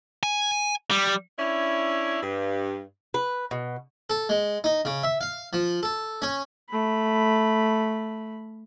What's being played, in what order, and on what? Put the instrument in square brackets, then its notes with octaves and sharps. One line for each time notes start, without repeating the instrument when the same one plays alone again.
[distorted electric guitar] G#5
G3
[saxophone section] C#4 D4 E4
G2
[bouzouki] B4
B2
[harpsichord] A4
G#3
D#4
C#3
E5
F5
F3
A4
C#4
[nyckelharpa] A3 B5